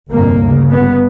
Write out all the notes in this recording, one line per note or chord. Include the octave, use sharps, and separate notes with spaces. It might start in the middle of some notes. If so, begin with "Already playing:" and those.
G1 F2 C3 A#3
D2 C#3
G1 G2 B3